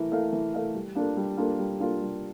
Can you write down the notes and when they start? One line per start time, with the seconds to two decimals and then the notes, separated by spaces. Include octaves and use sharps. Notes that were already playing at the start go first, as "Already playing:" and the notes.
Already playing: E3 A3 E4 A#4
0.12 A3 E4 A#4 F5
0.33 E3
0.54 A3 E4 A#4 F5
0.75 G3
0.95 A#3 D4 F4 A4
1.17 G3
1.37 A#3 D4 F4 A4
1.59 G3
1.80 A#3 D4 F4 A4
2.01 G3